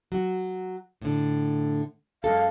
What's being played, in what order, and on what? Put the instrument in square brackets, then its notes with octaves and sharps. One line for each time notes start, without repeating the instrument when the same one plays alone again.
[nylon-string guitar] F#3 F#4
A2 D3
[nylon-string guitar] F#2 G#3 A4 [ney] F5